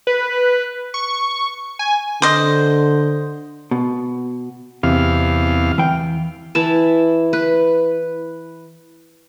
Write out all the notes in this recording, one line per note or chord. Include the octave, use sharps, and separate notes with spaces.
B4
C#6
G#5
D3 C5 D#5
B2
E2 C3 F5
E3 G5
E3 E4 A5
B4